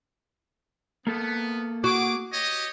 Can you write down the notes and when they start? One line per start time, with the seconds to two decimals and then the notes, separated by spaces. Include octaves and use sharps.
1.07 A#3 B3 A4
1.84 F#4 G#4 D6
2.32 G4 C#5 D#5